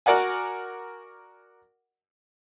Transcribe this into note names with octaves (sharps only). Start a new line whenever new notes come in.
F#4 A#4 D5 F#5 G#5